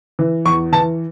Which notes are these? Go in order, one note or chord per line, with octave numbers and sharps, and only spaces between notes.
E3
E2 C#6
E3 A5